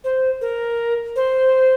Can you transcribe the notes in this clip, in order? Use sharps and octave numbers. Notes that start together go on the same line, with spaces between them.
C5
A#4
C5